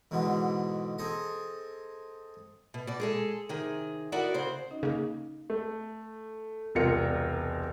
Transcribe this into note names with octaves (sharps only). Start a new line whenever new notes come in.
E2 G#2 B2 D3 E3
C4 G#4 A4 D#5
B2
B2 D5
G#3 G#4 A4
C3 D#3 G#4
E4 F#4 A#4 D5 D#5
C#3 C5
C#4 D#4 D#5
C#3 A#3
A3
E1 C2 F4 A#4 C#7